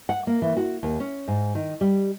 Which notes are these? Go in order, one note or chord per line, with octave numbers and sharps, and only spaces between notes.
F#5
A#3
E3
F#4
D#2
C#4
G#2
D#3
G3